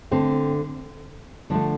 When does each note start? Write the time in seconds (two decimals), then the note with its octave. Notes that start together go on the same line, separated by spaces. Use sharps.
0.11 D3 A3 C4
1.50 D3 F3 A3 D4